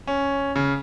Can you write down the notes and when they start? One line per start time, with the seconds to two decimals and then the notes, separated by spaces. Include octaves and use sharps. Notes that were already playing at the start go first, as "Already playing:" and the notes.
0.07 C#4
0.56 C#3